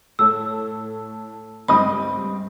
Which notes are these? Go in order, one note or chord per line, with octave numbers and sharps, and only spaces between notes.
A2 A4 C#5 E6
C#2 G2 C4 D#5 B5 D#6